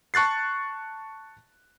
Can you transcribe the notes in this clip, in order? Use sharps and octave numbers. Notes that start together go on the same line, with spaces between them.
A5 C#6 F#6 A6 C7